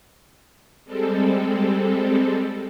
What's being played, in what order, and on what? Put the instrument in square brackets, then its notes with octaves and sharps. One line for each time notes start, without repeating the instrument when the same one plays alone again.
[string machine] G3 G#3 C4 A4